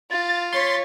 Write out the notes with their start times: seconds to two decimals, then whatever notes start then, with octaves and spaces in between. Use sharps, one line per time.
0.11 F4 A6
0.53 C#5 C6 A6 B6